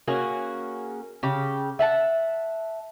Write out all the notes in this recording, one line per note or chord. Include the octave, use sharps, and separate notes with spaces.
A#3 C#4 F#4 G#4
C#3 G4
E5 F#5 A5